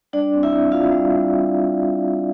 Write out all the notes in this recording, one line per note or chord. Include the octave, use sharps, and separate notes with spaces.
G3 D4 D5
C4
E4 E5
C4
F4 F5
G3
G3